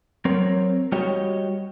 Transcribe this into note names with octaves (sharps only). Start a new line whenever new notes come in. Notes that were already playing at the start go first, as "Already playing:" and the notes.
F#3 C4 A#4 C#5
G3 F#4 G4 C#5 D#5